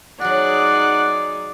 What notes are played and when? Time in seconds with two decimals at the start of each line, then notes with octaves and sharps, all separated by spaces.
0.21 F#3 D#4 F#4 G#4 D5 F#5